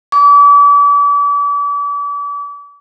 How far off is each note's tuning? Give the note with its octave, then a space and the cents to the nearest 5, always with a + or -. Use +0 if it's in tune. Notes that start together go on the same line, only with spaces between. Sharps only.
D6 -40